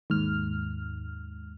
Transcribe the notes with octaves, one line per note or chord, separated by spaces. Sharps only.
D#2 G#2 F6